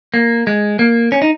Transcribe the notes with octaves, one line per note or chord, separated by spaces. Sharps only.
A#3
G#3
A#3
C#4
D#4